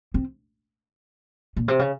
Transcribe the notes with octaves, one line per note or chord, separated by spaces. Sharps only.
C4
A#2
C3
C#3